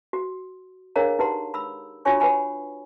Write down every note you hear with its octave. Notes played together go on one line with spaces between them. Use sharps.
F#4
D4 G#4 A#4 C#5 F5 A#5
D#4 G4 B4 F#5 A#5 C6
B5 E6
D4 F4 F#4 C#5 G#5 C#6
B4 C#5 F#5 G#5 B5